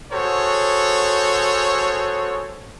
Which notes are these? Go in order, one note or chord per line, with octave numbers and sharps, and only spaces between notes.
F#4 G#4 A4 C5 C#5